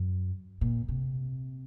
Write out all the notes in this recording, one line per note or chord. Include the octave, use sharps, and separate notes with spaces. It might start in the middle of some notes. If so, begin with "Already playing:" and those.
Already playing: F#2
A#2
C3